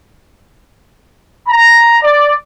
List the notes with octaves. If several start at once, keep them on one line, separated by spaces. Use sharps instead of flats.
A#5
D5